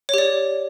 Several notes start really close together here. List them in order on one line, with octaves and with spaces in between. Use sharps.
C#5 G4 D5